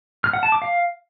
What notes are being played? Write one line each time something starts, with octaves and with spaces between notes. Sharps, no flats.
F6
F#5
A5
D6
F5